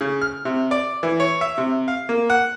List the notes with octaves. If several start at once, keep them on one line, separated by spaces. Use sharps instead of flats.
C#3
F6
C3
D5
E3
C#5
E5
C3
F5
A#3
F#5